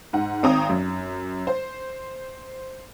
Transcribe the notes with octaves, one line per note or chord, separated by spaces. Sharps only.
G#2 F#5
G#1 C4 A#5 D#6
F#2
C5